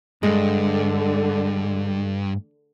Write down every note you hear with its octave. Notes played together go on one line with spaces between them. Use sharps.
G2 D3 G#3